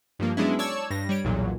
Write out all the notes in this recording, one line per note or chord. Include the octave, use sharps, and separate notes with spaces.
G2 F3 A#3
F#3 G#3 B3 C#4 D4 E4
C#5 D5 A5 C#6 E6 G#6
G2 A#6
G3 C#5 D7
B1 E2 A#2 F#3